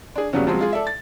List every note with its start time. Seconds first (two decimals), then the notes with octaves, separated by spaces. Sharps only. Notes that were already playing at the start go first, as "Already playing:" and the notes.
0.16 D4 G#4
0.33 D#2 C#3 F#3 G3 B3 C#4
0.47 F3 F#3 G#3 C4
0.59 G#3 F4 G#4
0.73 A4 D5 E5
0.87 A6